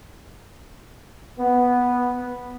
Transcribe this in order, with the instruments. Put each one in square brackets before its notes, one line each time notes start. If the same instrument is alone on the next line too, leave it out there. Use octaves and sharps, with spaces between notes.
[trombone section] B3